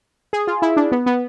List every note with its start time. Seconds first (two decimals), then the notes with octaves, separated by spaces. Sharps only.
0.33 G#4
0.47 F4
0.62 E4
0.77 D4
0.92 B3
1.06 B3